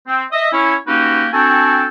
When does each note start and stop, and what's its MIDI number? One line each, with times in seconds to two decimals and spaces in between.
0.07 0.23 60
0.32 0.48 75
0.32 0.48 76
0.52 0.75 61
0.52 0.75 64
0.52 0.75 73
0.87 1.27 58
0.87 1.27 61
0.87 1.27 63
0.87 1.27 66
0.87 1.27 67
0.87 1.27 71
1.33 1.87 60
1.33 1.87 62
1.33 1.87 66
1.33 1.87 69
1.33 1.87 79
1.33 1.87 80